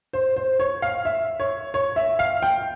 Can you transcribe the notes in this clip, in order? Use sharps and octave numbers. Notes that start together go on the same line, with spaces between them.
C5
C5
C#5
F5
E5
C#5
C#5
E5
F5
G5